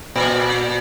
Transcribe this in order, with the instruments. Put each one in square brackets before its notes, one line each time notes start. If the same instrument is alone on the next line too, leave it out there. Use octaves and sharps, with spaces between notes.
[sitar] A#2